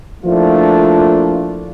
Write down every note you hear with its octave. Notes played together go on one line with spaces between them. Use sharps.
F3 A3 A#3 D4 E4 F4